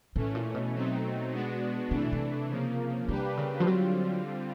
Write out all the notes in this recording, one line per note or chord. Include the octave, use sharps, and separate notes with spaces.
A2 E3 A3 C#4
A#2
B2
F#3 A3 C4 D#4
G#3 B3 D4 F#4
C3 E3 A3 D4
B2
C3
C#3 F3 A#3
C3 G3 A#3 D4 G4 B4
C#3
F3
D3 F#3 G3 C4 F4